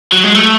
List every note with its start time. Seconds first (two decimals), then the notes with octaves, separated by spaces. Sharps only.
0.12 F#3
0.24 G#3
0.35 A3